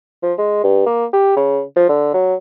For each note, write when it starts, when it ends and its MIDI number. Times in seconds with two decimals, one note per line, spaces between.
0.23 0.33 53
0.39 0.60 56
0.64 0.85 43
0.86 1.05 58
1.13 1.36 67
1.37 1.62 49
1.76 1.89 53
1.89 2.11 50
2.14 2.35 54